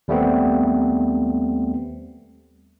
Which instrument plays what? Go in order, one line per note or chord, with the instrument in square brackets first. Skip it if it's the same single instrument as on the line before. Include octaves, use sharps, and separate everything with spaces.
[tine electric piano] D#2 G3 A3 B3 C4